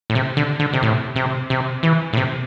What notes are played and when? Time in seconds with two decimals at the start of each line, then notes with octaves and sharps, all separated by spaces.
0.10 A2
0.15 C3
0.37 D3
0.59 D3
0.73 C3
0.83 A2
1.16 C3
1.50 C3
1.83 E3
2.13 A2
2.17 C3